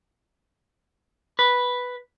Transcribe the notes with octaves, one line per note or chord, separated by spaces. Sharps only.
B4